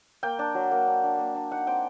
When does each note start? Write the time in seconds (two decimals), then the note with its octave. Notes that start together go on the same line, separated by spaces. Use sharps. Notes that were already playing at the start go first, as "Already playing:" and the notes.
0.23 A#3 G5
0.39 D4
0.55 F#3
0.71 A#3
0.87 D4
1.04 D4
1.19 A#3
1.35 D4
1.52 D#4 F#5
1.67 C4 G5